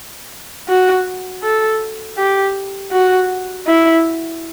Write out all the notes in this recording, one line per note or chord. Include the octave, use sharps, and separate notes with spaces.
F#4
A4
G4
F#4
E4